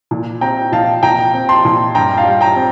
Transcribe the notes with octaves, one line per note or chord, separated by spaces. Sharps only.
A#2
C4 G5 A#5
A#2 F5 A5
A#2 G5 A#5
C4
A5 C6
A#2
G2 G5 A#5
F5 A5
G3
G5 A#5
C4